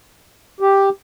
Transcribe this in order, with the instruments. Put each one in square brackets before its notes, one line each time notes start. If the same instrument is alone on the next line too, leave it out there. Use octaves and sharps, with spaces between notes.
[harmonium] G4